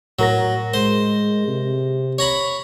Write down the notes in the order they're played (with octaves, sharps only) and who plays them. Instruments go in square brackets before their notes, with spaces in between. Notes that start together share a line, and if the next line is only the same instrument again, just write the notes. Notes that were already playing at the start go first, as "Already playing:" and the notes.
[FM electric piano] A2 A#4 A#6 [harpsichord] F#3
[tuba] G#3 [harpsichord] C5
[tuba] C3
[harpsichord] C#5 A#5 B5